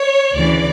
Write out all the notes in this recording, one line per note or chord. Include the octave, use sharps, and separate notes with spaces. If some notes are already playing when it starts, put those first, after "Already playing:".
Already playing: C#5
D2 C#3 E3 D5